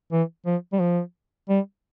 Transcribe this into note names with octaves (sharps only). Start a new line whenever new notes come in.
E3
F3
G3
F3
G3